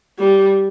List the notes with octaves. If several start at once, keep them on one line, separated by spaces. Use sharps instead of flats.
G3